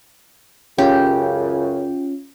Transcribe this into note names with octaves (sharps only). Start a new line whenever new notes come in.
C#2 F#2 C#3 C#4 F4 G4